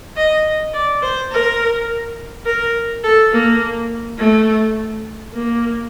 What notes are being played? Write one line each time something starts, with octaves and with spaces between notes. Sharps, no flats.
D#5
D5
C5
A#4
A#4
A4
A#3
A3
A#3